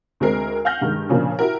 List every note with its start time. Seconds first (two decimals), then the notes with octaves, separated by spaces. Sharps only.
0.20 D2 G#3 C4 A#4 C7
0.65 F5 F#5 G#5 F6 G6 A#6
0.81 G2 D#3 G#3
1.09 A#2 C#3 F3 A#3 D4
1.39 E4 F#4 G4 A#4